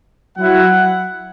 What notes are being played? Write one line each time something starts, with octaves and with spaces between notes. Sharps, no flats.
F#3 E4 F#5